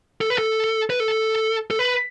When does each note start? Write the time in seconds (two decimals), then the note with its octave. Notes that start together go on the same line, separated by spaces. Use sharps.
0.21 A4
0.30 B4
0.38 A4
0.90 B4
1.00 A4
1.71 A4
1.79 B4